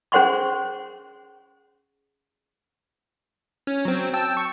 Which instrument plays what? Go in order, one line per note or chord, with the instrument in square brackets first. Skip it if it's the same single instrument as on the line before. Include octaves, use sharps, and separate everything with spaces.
[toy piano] C#4 G#4 C5 F#5 C6 C#6
[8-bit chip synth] C#4
F#3 C4
G5 A5 E6
C#6